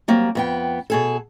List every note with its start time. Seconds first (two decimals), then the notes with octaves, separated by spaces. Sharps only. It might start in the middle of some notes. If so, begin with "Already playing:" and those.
0.08 F#3 G3 A#3 C4
0.35 F2 B3 G5
0.90 B2 G#4 A4